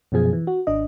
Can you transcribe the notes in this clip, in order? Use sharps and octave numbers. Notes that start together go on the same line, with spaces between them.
F#2 B2 F3 G#4 G#5
E3
F#4
G#1 D4 D#5